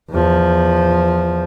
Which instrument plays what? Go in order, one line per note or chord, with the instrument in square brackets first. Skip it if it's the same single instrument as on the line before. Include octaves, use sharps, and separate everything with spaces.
[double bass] E2 F3